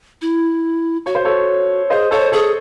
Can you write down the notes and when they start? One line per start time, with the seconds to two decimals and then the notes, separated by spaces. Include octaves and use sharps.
0.22 E4
1.06 F#4 C#5
1.15 C5
1.25 A4 C#5
1.90 G#4 C5 D#5
2.11 A4 C5 C#5
2.32 G#4 A4 C#5